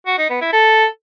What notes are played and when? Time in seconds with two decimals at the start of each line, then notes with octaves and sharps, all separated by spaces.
0.07 F#4
0.18 D#4
0.30 B3
0.41 E4
0.53 A4